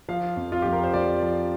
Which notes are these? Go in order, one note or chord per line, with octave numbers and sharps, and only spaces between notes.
F3 F5
F2
F4
F2 G4
A#4
C5
F3 D5
F3